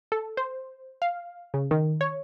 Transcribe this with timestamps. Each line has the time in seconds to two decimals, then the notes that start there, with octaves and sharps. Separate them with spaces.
0.12 A4
0.37 C5
1.02 F5
1.54 C#3
1.71 D#3
2.01 C#5